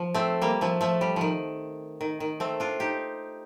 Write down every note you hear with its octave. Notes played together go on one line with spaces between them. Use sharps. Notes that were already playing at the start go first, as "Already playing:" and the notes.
Already playing: F3
A3 C4
G3 A#3
F3 A3
F3 A3
G3
D#3 F3
D#3
D#3
A3 C4
D4 F4
D#4 G4